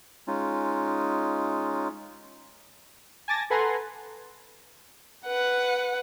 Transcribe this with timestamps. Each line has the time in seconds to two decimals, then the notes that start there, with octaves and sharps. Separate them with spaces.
0.27 G#3 C#4 D#4 F4
3.28 G#5 A5 D6 A6 A#6
3.50 A4 B4 F#5 G#5 A#5 C6
5.25 B4 F#5